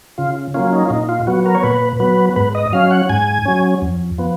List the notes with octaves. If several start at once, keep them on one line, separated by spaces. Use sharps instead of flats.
C#3 F4
F#3 A#3 C#4 F4
D#4
F4
A#2 D#4
F4
F#3 B3 F#4
A#4
C#5
A#2 B4
F#3 B3 B4
G#2 B4
D#5
F#3 C#4 F5
F#5
G#2 G#5
F#3 C#4
F2
F3 B3